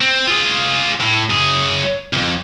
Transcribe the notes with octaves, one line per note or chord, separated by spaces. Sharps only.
C4
F4 G#4
A2
F#2 G#4
C2 F2